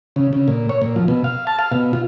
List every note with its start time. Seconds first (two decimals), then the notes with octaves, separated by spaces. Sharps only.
0.16 C#3
0.33 C#3
0.48 A#2
0.69 C#5
0.82 A#2
0.96 F3
1.08 B2
1.24 F5
1.47 A5
1.59 F5
1.72 B2
1.93 F4